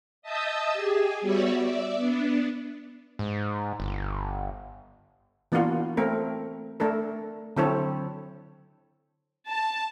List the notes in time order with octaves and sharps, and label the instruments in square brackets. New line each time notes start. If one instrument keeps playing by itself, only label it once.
[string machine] D#5 E5 A5 D#6 E6 G6
G4 G#4 G#5
G3 B3 F#4 C#5 D5 E5
D5 E5
B3 D4
[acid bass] G#2
G1
[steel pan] E3 A#3 B3 D4 F4 F#4
A3 C4 A#4
A3 D4 A4 A#4
D3 F#3 C4 E4 A4 C#5
[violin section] A5